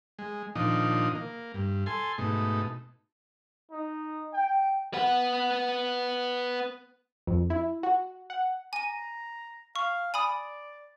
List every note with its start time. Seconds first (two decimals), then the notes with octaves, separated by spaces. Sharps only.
0.19 G#3
0.55 A#2 D#3 F3 D4 D#4
1.15 A#3
1.54 G2
1.86 A4 G#5 C6
2.18 G#2 B2 A3 D#4
3.71 D#4
4.34 G5
4.94 B3 F#5
7.27 F2
7.50 E4
7.83 F#4
8.30 F#5
8.73 G#5 A#5 D#7
9.76 F5 C#6
10.14 D5 G#5 B5 D#6